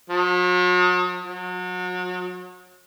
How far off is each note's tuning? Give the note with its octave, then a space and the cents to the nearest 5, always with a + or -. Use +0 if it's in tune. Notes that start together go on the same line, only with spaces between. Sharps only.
F#3 -45
F#3 -35